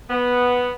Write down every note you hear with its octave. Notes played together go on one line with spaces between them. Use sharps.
B3